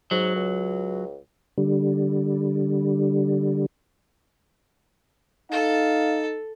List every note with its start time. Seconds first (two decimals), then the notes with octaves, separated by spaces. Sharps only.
0.11 G#2 F#3
0.36 C#2
1.58 D3 G3
5.51 D#4 A4 F5